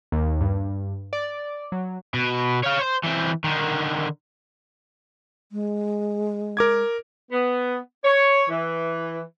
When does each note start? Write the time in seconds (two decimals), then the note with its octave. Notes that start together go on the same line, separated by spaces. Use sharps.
0.12 D#2
0.41 G2
1.13 D5
1.72 F#3
2.14 B2
2.64 C#5 F5
2.81 C5
3.04 E3 C4
3.44 D3 D#3
5.52 G#3
6.57 A#4 D6 G#6
7.32 B3
8.05 C#5
8.49 E3